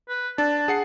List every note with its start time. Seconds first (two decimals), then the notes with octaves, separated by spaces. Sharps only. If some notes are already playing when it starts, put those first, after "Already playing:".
0.09 B4
0.38 D4 A5
0.68 G#4 F#5 C7